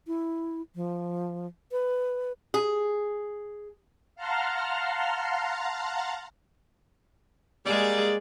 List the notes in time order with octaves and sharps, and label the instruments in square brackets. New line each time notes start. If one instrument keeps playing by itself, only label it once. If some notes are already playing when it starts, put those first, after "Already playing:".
[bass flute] E4
F3
B4
[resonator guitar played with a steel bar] G#4
[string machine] F5 F#5 A5 A#5 C6 F6
[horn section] G3 A#3 D5 [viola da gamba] G#3 G#4